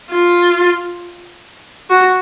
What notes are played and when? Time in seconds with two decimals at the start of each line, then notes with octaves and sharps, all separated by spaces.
0.10 F4
1.90 F#4